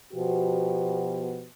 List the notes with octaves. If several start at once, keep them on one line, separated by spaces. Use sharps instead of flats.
B2 F3 B3 F#4 G4